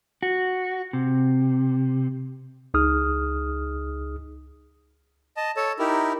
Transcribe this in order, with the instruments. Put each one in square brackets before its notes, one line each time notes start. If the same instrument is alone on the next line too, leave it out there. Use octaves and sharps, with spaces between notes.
[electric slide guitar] F#4
C3
[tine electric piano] C#2 D#4 G#4 D#6 F6
[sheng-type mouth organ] D#5 A5
A4 C#5 A5
D#4 E4 G4 A#4